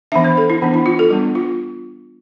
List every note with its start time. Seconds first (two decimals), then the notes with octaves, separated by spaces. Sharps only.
0.12 E3 B3 D4 E5
0.24 C5
0.37 A4
0.50 E4
0.62 E3 B3 D4
0.74 E4
0.86 F4
0.99 A4
1.11 G3 B3 D4
1.35 F4